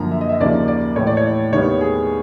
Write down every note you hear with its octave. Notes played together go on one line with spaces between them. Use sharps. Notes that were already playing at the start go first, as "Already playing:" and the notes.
Already playing: F#2 D3 F3 A#3 A#5
E5
D#5
E5
D#5
D#2 C#3 F3 A#3 D5
D5
A2 E3 A3 C#5
D5
C#5
D#2 D#3 G3 B3 C#5
G#4